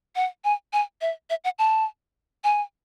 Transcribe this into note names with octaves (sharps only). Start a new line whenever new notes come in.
F#5
G#5
G#5
E5
E5
F#5
A5
G#5